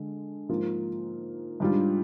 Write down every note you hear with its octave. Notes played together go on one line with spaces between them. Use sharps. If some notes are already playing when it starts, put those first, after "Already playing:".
Already playing: D3 G#3
G#2 F3 A#3 F4
G#2 G3 D4 F4